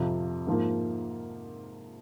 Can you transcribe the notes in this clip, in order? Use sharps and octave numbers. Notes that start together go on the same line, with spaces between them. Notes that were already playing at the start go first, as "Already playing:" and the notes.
Already playing: F2 C3 F3
G#2 F3 A#3